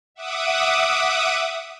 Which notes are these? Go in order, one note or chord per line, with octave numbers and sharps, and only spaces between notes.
E5 F#5 D6 D#6